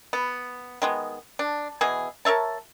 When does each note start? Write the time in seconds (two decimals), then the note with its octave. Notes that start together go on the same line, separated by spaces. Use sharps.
0.13 B3
0.82 D#3 G#3 B3
1.39 D4
1.81 B2 E3 G#4
2.25 A#4 C#5 E5 A5